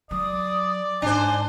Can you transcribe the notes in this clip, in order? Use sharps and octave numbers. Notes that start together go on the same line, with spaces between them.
F#3 D5 D#6
G#2 D4 C5 G#5